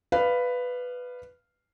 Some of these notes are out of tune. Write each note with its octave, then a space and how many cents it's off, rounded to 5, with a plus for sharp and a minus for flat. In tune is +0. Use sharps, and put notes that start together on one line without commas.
B4 +5 D5 +40 F5 -5